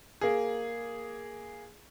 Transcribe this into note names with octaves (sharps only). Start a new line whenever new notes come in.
A#3 G#4